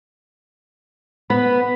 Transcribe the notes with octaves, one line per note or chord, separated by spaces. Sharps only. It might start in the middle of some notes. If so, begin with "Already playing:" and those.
B3 B5